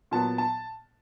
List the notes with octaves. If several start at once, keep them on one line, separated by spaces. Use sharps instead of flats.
A#2 F#3 B3 A5
A5